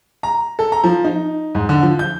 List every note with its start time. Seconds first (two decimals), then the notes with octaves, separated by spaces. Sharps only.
0.23 A#5
0.59 A4
0.72 A#5
0.84 F3
1.04 D#4
1.55 G#2
1.69 D3
1.83 F3
1.99 G6